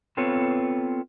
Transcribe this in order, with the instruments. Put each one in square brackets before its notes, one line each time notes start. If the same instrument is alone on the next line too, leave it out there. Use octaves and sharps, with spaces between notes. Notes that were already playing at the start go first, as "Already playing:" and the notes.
[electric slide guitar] B3 C4 F4 A4 B4 C#5